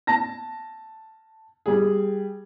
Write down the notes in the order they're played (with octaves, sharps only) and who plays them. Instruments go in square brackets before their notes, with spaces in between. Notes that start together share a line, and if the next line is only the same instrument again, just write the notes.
[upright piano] A5 A#6
G3 G#4